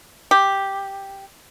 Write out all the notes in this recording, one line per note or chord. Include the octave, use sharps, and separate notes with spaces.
G4